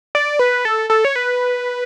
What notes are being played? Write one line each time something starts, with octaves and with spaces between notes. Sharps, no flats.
D5
B4
A4
A4
C#5
B4